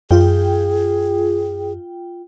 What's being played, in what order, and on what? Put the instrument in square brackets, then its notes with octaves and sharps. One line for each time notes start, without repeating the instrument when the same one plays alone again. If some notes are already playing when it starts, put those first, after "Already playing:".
[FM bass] F#2 [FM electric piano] F4 G5 [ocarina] G#4